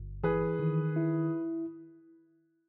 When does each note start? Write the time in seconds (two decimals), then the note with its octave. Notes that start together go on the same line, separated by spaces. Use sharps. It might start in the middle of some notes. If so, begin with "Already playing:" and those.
Already playing: G1
0.23 E3 G#4 B4
0.59 D#3
0.96 E4